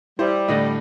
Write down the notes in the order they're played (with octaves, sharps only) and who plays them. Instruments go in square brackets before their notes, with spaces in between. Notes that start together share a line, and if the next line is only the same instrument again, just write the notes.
[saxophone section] G3 [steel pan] E4 [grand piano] C5
[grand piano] A2 D3 [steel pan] D#5